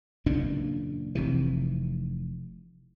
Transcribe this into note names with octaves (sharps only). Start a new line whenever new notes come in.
F#1 E2 A#2 D4
F1 C3 E3